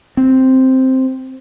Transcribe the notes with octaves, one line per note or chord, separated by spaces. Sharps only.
C4